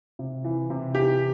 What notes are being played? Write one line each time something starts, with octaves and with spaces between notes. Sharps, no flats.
C3
E3
C3
E3 G4